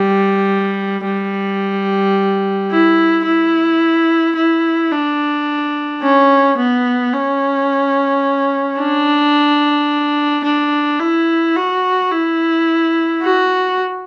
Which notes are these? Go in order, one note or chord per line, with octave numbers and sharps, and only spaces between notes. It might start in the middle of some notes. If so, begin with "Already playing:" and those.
Already playing: G3
G3
E4
E4
E4
D4
C#4
B3
C#4
D4
D4
E4
F#4
E4
F#4